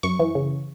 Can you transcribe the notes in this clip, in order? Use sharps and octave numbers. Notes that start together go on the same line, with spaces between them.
F#2 C#6
E3
C#3